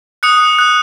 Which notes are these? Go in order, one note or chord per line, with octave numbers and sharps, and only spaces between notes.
D#6 F#6 C#7
D#6 F#6